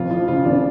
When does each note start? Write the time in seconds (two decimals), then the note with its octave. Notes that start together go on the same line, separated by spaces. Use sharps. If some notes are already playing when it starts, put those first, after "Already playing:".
Already playing: F1 F2 F4
0.10 F3 F4
0.28 C#3 F4
0.45 F1 D4